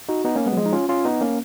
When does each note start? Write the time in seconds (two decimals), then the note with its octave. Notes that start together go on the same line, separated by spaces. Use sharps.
0.09 D#4 F#4
0.25 B3 D#4
0.35 A#3 C#4
0.46 G#3 B3
0.52 F#3
0.56 F3 G#3
0.66 D#4
0.72 C#4 F4
0.89 C#4 F4
1.05 B3 D#4
1.21 A#3 C#4